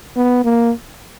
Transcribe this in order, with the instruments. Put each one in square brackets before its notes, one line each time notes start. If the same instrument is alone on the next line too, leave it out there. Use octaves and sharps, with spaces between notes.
[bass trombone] B3
A#3